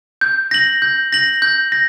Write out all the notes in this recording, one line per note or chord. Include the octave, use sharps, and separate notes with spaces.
G6
A#6 F#7
G6
A#6 F#7
G6
A#6